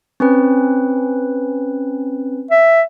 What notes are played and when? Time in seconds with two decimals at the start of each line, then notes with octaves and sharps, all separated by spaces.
0.20 C4 C#4 B4
2.51 E5